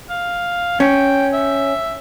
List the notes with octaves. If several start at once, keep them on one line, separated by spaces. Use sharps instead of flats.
F5
C#4 G5
E5